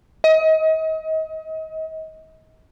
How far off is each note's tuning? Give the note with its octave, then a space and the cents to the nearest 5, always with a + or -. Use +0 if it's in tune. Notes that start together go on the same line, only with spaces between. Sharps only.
D#5 +30